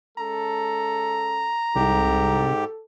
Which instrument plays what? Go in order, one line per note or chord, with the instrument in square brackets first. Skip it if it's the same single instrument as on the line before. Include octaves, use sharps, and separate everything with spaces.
[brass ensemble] G#3 C#4 A4 [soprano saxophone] A#5
[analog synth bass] C2 [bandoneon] G#2 G4 [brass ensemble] A4